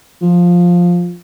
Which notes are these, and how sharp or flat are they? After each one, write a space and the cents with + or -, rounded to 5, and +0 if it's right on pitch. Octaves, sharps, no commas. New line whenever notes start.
F3 +10